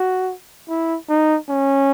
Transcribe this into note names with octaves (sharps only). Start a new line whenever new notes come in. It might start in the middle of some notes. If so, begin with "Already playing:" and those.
Already playing: F#4
E4
D#4
C#4